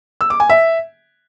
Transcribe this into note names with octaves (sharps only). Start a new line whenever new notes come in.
E6
D6
G#5
E5